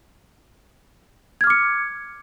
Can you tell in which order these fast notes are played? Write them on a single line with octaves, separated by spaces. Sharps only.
G#6 F6 D6 C#7